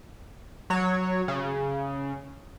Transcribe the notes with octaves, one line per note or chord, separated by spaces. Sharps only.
F#3 C#5
C#3